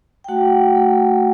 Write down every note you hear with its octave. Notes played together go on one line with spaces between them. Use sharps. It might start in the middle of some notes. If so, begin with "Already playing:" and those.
G5
A3 F#4 F#5
A3